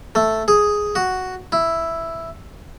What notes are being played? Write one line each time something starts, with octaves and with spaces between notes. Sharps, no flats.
A3
G#4
F#4
E4